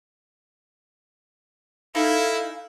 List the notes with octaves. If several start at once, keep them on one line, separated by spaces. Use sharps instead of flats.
D#4 E4 A4 F5 G#5